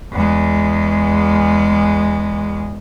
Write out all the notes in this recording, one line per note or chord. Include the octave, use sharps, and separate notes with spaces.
E2 G#3